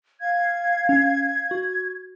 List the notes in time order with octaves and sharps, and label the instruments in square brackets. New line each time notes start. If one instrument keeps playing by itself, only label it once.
[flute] F5 [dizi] G#6
[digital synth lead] C#4
F#4